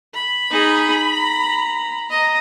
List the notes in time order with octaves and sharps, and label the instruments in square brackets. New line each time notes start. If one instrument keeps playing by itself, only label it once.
[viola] B5
[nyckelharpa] D#4 G#4
A#5
D#5 A#5